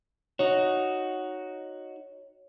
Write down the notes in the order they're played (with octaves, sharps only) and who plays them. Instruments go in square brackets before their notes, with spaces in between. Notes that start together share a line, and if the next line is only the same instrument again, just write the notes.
[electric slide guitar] D#4 F#4 [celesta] C#5